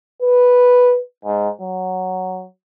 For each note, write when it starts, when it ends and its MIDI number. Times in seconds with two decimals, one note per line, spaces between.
0.22 0.98 71
1.25 1.49 44
1.61 2.45 54